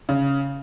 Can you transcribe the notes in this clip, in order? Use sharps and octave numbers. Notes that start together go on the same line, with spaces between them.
C#3